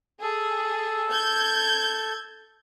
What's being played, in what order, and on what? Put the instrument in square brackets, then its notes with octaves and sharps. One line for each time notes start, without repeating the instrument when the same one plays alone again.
[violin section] G#4 [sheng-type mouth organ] A4
[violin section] G6 G#6